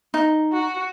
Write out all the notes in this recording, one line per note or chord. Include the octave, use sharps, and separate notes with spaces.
D#4
F#4